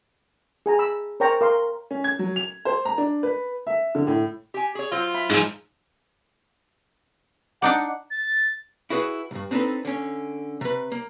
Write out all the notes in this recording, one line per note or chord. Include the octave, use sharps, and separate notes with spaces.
G#4 G#5 A#5
B5 E6
A#4 C5 C#5 G5 A#5 C#6
A#4 F5 C6
C#4
G#6
F#3
F7
C5
A#5
D4
B4
E5
D3
A2
G4 G#5
G#4 C#5
F#3 F4 C5
E5 B5
G#2 F3 D#4 G#4 E6
D4 D#4 D5 F#5
A6
E4 F#4 G#4 B4 F#5
B1 G2
C4 D4 D#4 F4 A4 B4
D3 C#4
C3 B4
A#3